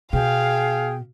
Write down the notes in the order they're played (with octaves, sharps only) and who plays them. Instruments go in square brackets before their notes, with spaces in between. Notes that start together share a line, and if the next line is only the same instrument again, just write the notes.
[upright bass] B2 [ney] G#4 [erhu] F5 [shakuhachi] G5